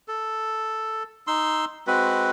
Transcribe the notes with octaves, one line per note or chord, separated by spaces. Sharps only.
A4
D#4 C6 E6
G#3 C4 F#4 B4